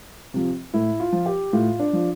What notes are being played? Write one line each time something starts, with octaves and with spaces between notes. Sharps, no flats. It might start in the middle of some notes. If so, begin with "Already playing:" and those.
C3 F3
A2 E4
F4
F3
G4
A2 F4
D4
F3